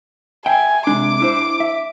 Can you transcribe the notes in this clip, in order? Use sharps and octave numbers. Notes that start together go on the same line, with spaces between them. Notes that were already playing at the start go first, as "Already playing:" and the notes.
E5 G5 G#5
C3 G#3 D4 D6
D4 E4 C5
E5